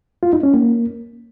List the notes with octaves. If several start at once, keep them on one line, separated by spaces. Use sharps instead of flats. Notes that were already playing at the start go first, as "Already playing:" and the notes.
F4
D#4
C#4
A#3